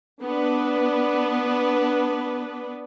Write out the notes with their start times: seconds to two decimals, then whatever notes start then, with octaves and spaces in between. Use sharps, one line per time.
0.23 B3 D4 B4